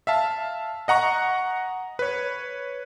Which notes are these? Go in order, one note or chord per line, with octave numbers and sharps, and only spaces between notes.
E5 F5 A5
D#5 F#5 A#5 C#6
B4 C#5